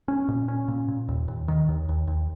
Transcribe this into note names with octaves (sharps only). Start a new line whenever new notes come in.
C#4
A#2
C#4
A#2
A#2
D#2
D#2
D#3
D#2
D#2
D#2